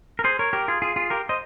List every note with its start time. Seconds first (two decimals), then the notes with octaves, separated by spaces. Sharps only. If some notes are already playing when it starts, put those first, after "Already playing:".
0.19 A#4
0.24 G#4 C5
0.39 A#4 C#5
0.53 G4 A#4
0.68 F4 G#4
0.82 F4 G#4
0.96 F4 G#4
1.10 G4 A#4
1.29 C5 D#5